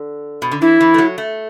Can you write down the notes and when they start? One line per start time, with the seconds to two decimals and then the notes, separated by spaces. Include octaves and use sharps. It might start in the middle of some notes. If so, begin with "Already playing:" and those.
Already playing: D3
0.42 B2
0.51 D3
0.62 E3 E4
0.81 E3
0.94 A3
0.98 F#3
1.18 A3